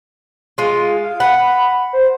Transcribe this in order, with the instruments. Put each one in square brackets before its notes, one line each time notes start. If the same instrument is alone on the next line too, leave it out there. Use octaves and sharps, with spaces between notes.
[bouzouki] G#3 F4
[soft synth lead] F5
[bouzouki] F#5 [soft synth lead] B5
[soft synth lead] C5